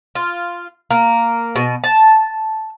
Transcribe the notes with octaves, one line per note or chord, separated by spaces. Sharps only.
F4
A#3
B2
A5